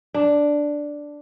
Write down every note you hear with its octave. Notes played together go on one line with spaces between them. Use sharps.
D4